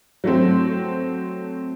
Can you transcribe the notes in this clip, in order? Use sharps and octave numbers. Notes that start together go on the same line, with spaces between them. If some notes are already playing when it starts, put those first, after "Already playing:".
F#3 A3 C4